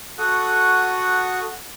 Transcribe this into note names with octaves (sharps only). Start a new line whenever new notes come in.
F#4 A4 F#5 C#6 D#6 F#6